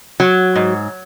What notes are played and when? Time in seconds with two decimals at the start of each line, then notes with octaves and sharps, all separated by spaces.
0.20 F#3
0.56 G#2